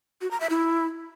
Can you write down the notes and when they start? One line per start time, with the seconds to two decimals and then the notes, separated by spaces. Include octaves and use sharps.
0.21 F#4
0.31 A#5
0.40 E5
0.50 E4